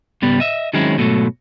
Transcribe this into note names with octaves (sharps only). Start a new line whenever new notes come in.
C#2 G#2 G3 B3
D#5 E5
D#3 F#3 G#3 C4 C#4 E4
G#2 B2 F#3 A3